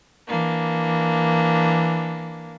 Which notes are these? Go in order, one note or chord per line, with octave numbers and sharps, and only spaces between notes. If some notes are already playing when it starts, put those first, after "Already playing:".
E3 A#3 D4